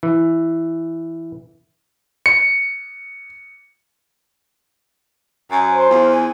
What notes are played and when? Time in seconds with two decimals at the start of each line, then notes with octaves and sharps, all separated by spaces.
0.03 E3
2.26 C#7
5.51 F#2 G#5
5.69 C5
5.90 E2 F4
6.10 G#5